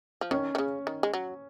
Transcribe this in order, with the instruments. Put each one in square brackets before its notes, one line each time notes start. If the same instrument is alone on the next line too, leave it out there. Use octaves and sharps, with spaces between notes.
[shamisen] F3
[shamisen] D#3 [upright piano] C#4 C#5
[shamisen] D#3
C#3
D#3
G#3
F#3